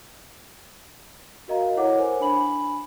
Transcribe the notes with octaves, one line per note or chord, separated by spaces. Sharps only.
F#4 A#4 D#5 F5 A#5
E4 A4 C#5 F#5 D6
A#4 C5 G#5
D4 G#5 B5 F#7